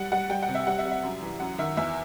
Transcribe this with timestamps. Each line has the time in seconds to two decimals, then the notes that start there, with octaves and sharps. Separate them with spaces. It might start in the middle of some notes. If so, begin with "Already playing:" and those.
Already playing: G3 F#5
0.12 G3 F#5
0.29 G3 G5
0.43 F#5
0.49 C3
0.55 E5
0.67 G3 F#5
0.78 E5
0.85 G3
0.91 E5
1.03 F#2
1.22 E3
1.40 F#2 F#5
1.58 D#3 E5
1.77 E2 E5